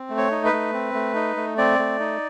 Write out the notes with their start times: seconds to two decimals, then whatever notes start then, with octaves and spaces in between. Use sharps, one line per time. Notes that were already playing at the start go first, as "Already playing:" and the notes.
Already playing: C4
0.10 A3
0.17 C#5
0.31 D#4
0.45 B4
0.53 A3
0.73 C4
0.94 A3
1.15 D#4
1.36 A3
1.57 C4 D5
1.79 A3
2.00 D#4